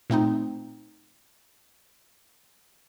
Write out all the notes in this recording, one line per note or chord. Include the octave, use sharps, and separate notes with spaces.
A#2 A3 C4 D#4